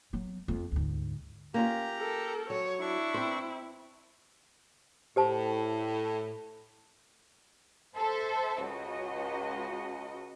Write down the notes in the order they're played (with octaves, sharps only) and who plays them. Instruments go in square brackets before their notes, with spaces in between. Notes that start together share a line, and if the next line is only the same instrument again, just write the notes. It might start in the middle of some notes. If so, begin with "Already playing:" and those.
[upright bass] F#3 B3
F2 A3
D2 G#2
[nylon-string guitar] A#3 C#4 F4 [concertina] G4 A#5
[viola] A4 A#4
[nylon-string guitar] F#3 [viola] C#5
[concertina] D4 C#6 [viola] E4
[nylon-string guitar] C4 C5
[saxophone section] A2 [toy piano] G4 C5 A5
[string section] A4 C5 E5
C#2 F#4 D#5